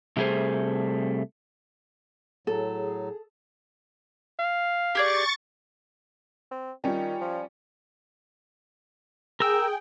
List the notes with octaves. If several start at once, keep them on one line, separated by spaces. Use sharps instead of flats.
C3 G3 A3 G#4 C5
A2 F#3 G#4 A4
F5
G4 G#4 D5 C#6 A6
C4
D#3 G3 C#4 F4 G5
F3
G#4 A#4 G5 E6